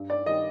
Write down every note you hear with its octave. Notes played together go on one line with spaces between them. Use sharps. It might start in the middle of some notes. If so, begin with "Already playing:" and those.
Already playing: G2
D5
D#3 G3 D#5